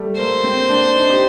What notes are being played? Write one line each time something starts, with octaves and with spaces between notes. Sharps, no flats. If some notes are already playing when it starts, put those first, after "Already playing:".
Already playing: G3 A3
A#3 C5
C4
D4
D#4
G4